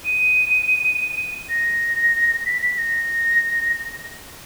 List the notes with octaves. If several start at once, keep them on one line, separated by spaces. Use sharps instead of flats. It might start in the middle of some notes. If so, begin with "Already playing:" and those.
D#7
A#6
B6
B6
A#6